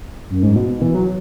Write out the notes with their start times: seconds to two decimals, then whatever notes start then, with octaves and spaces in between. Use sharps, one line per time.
0.30 F#2
0.43 G#2
0.56 B2
0.69 B2
0.82 E3
0.95 F#3